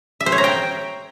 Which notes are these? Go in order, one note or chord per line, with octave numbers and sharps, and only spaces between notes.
E5
C5
C#5
A#5
G5